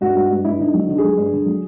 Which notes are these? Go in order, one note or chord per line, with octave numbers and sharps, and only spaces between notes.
G2 F#4
G2 F#4
G2
G2 E4
D3 D#4
F#3
D#4
D3
G#4
F#3
G2
D3
F#3